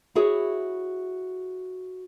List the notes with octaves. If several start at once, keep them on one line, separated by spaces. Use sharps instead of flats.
E4 F#4 G#4 C#5